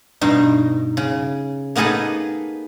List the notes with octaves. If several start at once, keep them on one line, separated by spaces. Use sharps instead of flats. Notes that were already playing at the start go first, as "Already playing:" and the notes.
G2 B2 D#4
C#3
A#3 B3 D#4 G#4 A4 B4